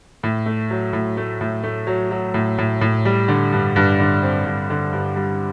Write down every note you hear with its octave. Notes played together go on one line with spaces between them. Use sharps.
A2
A3
F#3
A2
A3
A2
A3
F#3
F#3
A2
A2
A2
G3
D3
G2
G2
D3
C4
G2
D3
G2
G3